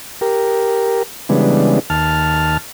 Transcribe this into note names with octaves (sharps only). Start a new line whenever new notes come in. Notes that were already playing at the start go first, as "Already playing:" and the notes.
G4 A#4
C#3 E3 G3 G#3 B3 D4
D#2 A5 F6